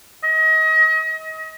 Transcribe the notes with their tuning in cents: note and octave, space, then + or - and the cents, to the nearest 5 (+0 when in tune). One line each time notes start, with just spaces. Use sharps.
D#5 +30